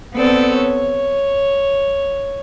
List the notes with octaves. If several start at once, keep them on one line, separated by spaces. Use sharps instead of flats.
B3 C4 A4 D5
C#5